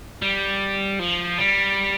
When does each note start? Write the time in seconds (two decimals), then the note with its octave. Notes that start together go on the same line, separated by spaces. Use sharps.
0.22 G3
1.00 F3
1.39 G3